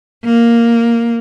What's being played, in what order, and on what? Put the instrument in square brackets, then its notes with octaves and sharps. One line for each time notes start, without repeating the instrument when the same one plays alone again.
[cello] A#3